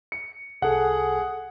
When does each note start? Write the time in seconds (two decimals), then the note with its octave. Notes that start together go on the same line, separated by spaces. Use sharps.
0.12 C#7
0.62 C2 G#4 A4 F#5